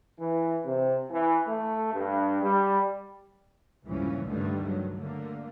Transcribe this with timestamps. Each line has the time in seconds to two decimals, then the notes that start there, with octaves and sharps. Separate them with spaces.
0.19 E3
0.65 C3
1.11 E3
1.47 A3
1.93 G2
2.43 G3
3.85 C#2 G2 A#2 E3 F3 C#4
4.27 G2 D3 D#3 G3 A3
4.64 D#3 F#3
4.96 D3 A3 A#3